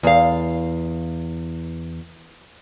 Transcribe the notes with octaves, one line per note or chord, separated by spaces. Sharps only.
E2 F5